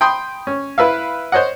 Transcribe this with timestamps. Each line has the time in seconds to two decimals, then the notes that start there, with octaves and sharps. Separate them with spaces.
0.01 G5 B5 C6 D#6
0.47 C#4
0.78 E4 B4 E5 F5
1.32 C5 C#5 D#5 F#5